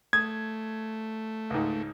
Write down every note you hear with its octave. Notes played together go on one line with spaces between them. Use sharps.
A3 D#6 G#6
C#2 G#2